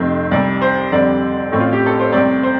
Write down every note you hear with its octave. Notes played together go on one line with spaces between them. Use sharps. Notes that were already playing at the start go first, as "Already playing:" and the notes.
Already playing: F1 F2 C3 A3 C4
C2 C3 G3 D5
C5
F2 D3 G3 C4 D5
A1 A2 A3 C4
F4
G4
A4
C5
C2 C3 A3 C4 D5
C5